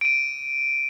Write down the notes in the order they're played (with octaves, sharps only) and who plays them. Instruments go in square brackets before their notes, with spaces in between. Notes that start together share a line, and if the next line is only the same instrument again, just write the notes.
[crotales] D7 D#7